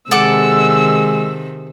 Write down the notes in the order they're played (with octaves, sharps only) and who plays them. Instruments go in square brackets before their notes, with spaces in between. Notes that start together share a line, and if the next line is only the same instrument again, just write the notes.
[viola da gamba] C3 D#3 [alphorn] G#3 [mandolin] A4 F#5 D6 [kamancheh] E6